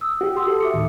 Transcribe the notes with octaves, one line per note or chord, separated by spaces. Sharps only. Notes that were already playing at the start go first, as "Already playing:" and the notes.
D#6 E6
F#4 G4
C6 D#6 E6
A4
E5 D6 C#7
D2 A2 D#3